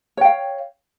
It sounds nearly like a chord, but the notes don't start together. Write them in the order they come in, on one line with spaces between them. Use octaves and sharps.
C#5 G5 F5